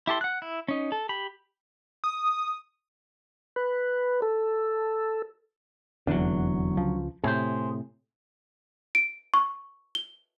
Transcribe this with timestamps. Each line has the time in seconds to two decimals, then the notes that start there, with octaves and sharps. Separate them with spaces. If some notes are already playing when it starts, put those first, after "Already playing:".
0.07 E4 G4 A4 C6
0.21 F#5 F#6
0.42 E4
0.68 C#4 D#4
0.92 A4
1.09 G4 B5
2.04 D#6
3.56 B4
4.22 A4
6.07 F1 E2 D3 F#3
6.77 C#2 F3
7.24 A2 C3 G#4 C5
8.95 D7
9.34 C#6
9.95 G7